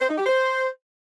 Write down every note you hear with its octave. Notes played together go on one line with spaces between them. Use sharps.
C5
D#4
G4
C5